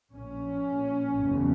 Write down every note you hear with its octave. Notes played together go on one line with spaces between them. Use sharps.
A#1 A#2 C#4
F#1 E2 C#3